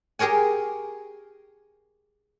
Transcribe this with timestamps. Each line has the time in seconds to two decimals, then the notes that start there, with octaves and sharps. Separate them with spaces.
0.19 G4 G#4 A#4 C#5 G#5